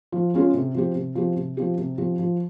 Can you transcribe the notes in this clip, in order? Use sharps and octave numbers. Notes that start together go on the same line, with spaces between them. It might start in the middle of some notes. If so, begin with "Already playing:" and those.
F3
G#3 C#4 F4 G#4
C3
F3 C4 G4
C3
F3 C4 G4
C3
F3 C4 G4
C3
F3 C4 G4
F3